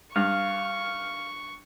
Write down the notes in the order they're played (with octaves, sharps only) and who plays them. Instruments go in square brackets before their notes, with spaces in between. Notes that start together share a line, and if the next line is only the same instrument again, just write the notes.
[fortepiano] G2 [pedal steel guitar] F5 [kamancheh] C#6